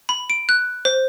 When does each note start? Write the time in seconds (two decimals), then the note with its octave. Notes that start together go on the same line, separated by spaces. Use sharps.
0.09 B5
0.30 D7
0.49 F#6
0.85 C5